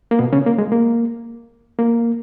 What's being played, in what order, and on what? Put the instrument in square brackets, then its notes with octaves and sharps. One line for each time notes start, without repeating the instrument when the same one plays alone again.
[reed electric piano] A#3
B2 B3
C#3 C#4
A#3
G#3
A#3
A#3